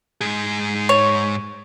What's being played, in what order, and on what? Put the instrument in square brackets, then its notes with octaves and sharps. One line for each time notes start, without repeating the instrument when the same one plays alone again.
[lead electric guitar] G#2 G#4
[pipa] C#5